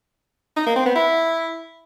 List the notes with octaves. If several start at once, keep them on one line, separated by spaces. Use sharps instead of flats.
D#4
A#3
C4
B3
E4